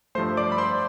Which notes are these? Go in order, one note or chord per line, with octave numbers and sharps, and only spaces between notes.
G2 F3 A3 C5 C6
D5 D6
B5
C5 C6